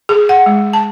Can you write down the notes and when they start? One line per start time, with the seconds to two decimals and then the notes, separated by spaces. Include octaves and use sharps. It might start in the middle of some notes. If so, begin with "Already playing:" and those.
0.09 G#4
0.29 F#5
0.46 G#3
0.73 A5